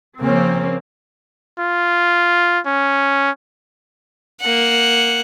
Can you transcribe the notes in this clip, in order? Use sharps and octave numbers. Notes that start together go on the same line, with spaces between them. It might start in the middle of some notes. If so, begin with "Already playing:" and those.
C#3 F3 A#3 C4 C#4
F4
C#4
A#3 F#5